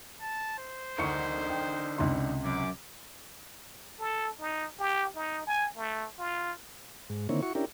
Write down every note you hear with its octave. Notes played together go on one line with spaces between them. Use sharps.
A5
C5
D2 D3 D#4 A#4 C#6 C#7
G5
C#2 C3 C6
F#2 D6
A4
D#4
G4
D#4
G#5
A3
F4
G#2
D3 D#3 A#3 C4 E4 C#5
E4 F#4 C#6
C#4 D4 E4 G4 A#4